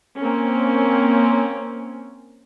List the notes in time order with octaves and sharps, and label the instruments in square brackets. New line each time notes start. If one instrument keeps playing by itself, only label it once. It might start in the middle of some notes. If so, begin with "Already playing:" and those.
[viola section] A#3 C4 C#4